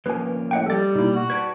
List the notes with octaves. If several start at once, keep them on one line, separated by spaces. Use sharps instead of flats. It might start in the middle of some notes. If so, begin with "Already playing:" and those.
F3 A#3 C#4 B4 G#5
A2 D#5 F#5 G5
G3 A4 A6
B2 A#3 D#4 E4
F#4
B4 D5 A5 G#6